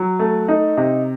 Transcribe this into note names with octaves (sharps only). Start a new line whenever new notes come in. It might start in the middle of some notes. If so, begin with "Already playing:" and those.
Already playing: F#3
A3
D#4
C3